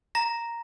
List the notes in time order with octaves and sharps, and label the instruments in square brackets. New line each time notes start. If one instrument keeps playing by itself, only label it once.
[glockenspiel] A#5 A#6